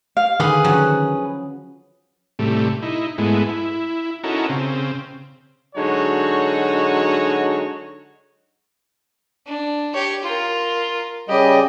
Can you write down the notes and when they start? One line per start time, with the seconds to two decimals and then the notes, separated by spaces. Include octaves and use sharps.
0.17 F5
0.40 D3 D#3 G4 G#4 B4 F5 F#5
0.64 F3 F#3 C#4
2.39 A2 C3 G3 A3
2.82 D#4 E4
3.18 G#2 G#3 A3 B3 E4
3.49 E4
4.24 C#4 D#4 E4 F#4 A4 A#4
4.49 C#3 C4
5.75 D3 F#3 G#3 D#4 F#4 C#5
9.47 D4
9.94 G4 C#5
10.23 F4 A#4
11.29 C#3 G3 G4 D#5